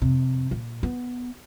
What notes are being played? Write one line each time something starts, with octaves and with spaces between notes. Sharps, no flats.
F2 C3
A#2
B3